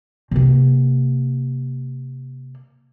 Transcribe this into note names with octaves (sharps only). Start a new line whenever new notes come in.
C3 A#3